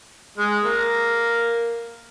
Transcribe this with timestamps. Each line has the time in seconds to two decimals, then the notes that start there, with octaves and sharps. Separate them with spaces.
0.37 G#3 G#4
0.64 A#3 A#4